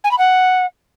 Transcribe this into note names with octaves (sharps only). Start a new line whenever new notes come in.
G#5
B5
F#5